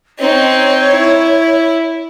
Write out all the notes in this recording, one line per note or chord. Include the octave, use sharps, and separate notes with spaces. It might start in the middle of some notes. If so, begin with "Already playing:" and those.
C4 D#4 C#5
E4